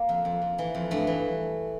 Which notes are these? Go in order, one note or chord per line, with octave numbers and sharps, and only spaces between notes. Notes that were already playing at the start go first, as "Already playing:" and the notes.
Already playing: A#3
F2
F2
F2
E3
F2
G2 A3
E3